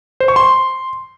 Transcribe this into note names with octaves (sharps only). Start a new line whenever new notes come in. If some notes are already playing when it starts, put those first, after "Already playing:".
C5
C#6
C6